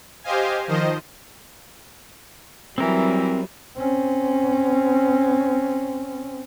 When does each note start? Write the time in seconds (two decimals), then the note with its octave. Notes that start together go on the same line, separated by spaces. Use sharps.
0.24 G4 C5 D#5 F5 G#5
0.68 D#3 F3 C5 D#5
2.78 E3 F#3 G3 C4 A#4
3.77 C4 C#4